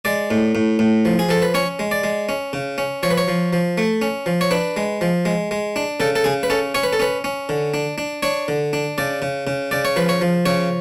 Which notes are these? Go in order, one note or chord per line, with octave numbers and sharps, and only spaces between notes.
G#3 D5
A2
A2
A2
F3
G#4
F3 A4
B4
C#4 C#5
G#3
D5
G#3
C#4
C#3
C#4
F3 C#5
B4
C#5
F3
F3
A3
C#4
F3
C#5
D4 B4
G#3
F3
G#3
G#3
D4
C#3 A4
A4
C#3 G#4
B4
C#4 A4
C#4 C#5
B4
A4
C#4 B4
C#4
D3
D4
D4
D4 C#5
D3
D4
C#3 D5
C#3
C#3
C#3 D5
C#5
F3 B4
C#5
F3
C#3 C#5